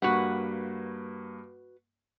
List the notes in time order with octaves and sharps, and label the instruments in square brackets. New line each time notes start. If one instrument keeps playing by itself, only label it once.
[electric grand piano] G2 A#3 [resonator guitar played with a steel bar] F#4 B4 F#5